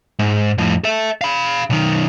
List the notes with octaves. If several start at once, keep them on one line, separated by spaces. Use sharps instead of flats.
G#2
F2 A2
A4 E5
F5 B5
B1 D#3